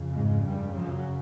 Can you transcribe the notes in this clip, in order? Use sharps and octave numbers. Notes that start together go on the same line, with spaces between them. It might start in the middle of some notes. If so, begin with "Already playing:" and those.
Already playing: F2 C#3
G#2 G#3
G2 G3
F#2 F#3